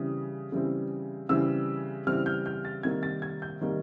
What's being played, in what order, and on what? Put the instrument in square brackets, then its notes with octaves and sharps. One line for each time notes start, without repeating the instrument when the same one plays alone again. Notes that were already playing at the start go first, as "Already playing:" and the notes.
Already playing: [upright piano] C#3 E3 G3 C4 D#6
C#3 E3 G3 C4
C#3 E3 G3 C4 E6
C#3 E3 G3 C4 F6
G6
G6
A6
C3 D#3 G3 A#3 G#6
A6
G#6
G6
C3 D#3 G3 A#3